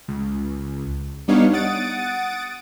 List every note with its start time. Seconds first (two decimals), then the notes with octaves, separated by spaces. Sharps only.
0.08 C#2
1.28 G3 B3 D4 D#4 C#5 F5
1.53 F#5 D#6 A6 D7